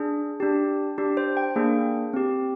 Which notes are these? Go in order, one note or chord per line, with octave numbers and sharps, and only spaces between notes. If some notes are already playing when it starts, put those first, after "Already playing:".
Already playing: D4 G#4
D4 G4
D4 G4
C5
G5
A#3 D4 G#4
C4 G4